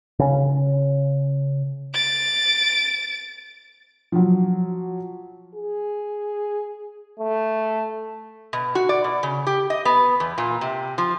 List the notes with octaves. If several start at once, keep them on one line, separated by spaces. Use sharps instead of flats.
C#3 C#4
A6 D7
F3 F#3
G#4
A3
B2
F#4
D5
B2
C#3
G4
D#5
B3
E2
A#2
C3
F3